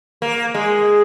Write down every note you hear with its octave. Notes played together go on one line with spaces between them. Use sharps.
A#3
G#3